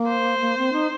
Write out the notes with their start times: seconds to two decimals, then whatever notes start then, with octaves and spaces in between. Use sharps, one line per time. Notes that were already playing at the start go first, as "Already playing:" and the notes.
Already playing: A#3
0.08 C5
0.41 A#3
0.58 C4
0.73 D#4